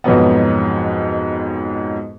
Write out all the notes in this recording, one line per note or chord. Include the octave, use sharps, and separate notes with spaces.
F2 G#2 B2 F#3 B3